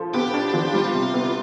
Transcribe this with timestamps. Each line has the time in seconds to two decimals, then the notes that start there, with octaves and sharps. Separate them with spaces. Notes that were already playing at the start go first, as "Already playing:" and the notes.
Already playing: F3 A4
0.14 B3 G4
0.34 D4
0.54 F3
0.74 G3 F4
0.94 C3
1.14 B3